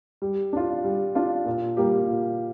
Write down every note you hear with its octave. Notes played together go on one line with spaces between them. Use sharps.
G3
D4 F4
G3
D4 F4
A#2
G3 A#3 G4
A#2